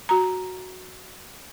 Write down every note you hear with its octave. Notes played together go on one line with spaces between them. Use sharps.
F#4 A#5